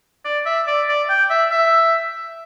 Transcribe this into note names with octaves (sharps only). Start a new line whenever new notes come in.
D5
E5
D5
D5
G5
E5
E5